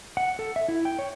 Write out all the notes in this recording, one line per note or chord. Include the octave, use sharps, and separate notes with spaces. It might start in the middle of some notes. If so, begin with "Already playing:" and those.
F#5
A4
E5
E4
G5
C#5